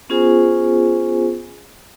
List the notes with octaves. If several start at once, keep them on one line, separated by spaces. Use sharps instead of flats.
B3 C#4 F4 G#4 C5 G#5